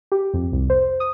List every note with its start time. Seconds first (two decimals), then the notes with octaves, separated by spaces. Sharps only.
0.12 G4
0.34 F2
0.52 C2
0.70 C5
1.00 D#6